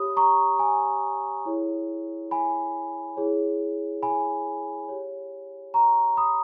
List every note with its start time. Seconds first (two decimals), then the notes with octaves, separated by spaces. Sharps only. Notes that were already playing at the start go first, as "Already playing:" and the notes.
Already playing: G4 C#5 B5 D#6
0.16 A#5 C#6
0.59 G#5
1.45 E4 G#4 C#5
2.31 G#5 B5
3.17 E4 G#4 C#5
4.03 G#5 B5
4.88 G4 C#5
5.74 A#5 C#6
6.17 B5 D#6